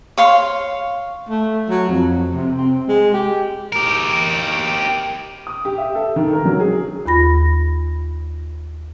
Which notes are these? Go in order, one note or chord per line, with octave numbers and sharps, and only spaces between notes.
C#5 F5 C6
A3
F#3
F2
C3
C4
G#3
G4
G4 A#4
D#6
G4
E5
A4
D#3
A#4
F#3
G#4
D#2 F4 B5 A#6